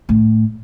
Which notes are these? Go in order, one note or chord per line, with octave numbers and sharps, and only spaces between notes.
A2